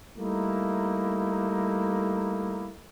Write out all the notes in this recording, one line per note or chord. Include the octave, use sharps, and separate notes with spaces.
G3 A3 A#3 D#4 E4